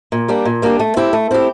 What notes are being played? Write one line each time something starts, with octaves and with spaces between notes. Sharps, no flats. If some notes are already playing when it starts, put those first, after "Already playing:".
A#2
G3 A#3 D4 G4
A#2
G3 A#3 D4 G4
A3
C4 E4 G4
A3
C4 E4 G4